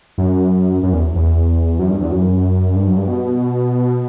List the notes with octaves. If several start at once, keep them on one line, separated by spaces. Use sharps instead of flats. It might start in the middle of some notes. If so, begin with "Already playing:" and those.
F#2
F#2
E2
E2
F#2
G2
E2
F#2
G2
F#2
G2
B2